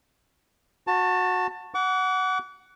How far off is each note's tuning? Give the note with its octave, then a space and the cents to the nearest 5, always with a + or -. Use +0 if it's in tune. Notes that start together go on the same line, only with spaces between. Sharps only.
F#4 -20 A5 +20
F#5 +5 D6 -40